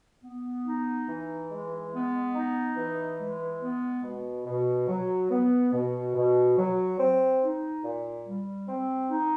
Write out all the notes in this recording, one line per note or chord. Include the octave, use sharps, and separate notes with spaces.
B3
D#4
E3
G#3
B3
D#4
E3
G#3
B3
B2
B2
F#3
B3
B2
B2
F#3
C4
D#4
A#2
G3
C4
D#4